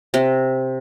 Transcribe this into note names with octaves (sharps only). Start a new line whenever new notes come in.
C3